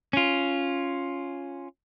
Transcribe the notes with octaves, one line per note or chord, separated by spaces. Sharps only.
C#4 F4